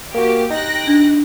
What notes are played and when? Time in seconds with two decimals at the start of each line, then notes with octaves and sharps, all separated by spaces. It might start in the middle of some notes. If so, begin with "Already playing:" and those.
0.14 A#3 F#4 G4
0.50 D#4 G4 G5 F#6 A#6
0.87 D4